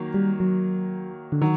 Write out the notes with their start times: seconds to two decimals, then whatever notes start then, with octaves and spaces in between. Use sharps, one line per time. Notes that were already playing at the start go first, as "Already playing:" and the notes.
Already playing: D#3 F#3 A#3
0.14 G3
0.40 F#3
1.32 D3
1.42 D#3 F#3